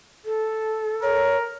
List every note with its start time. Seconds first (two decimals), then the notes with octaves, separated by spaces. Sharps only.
0.25 A4
1.02 A#4 C#5